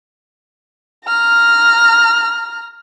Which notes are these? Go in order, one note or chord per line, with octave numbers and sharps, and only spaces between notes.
A#5 F6